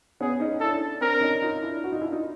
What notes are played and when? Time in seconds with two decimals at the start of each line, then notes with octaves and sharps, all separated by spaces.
0.21 B3 C#4 G#4
0.40 C#4 D#4
0.60 D4 E4 A4
1.01 C4 D4 A#4
1.21 C#4 D#4
1.42 D#4 F4
1.62 D4 E4
1.84 F#4
1.92 D#4 F4
2.01 D4 E4
2.12 D#4 F4